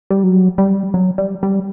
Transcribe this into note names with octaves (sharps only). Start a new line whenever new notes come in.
G3
F#3
G3
F#3
G3
G3